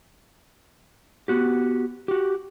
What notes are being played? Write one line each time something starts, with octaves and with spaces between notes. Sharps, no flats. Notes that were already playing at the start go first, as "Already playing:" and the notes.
B3 F#4 G4
F#4 G4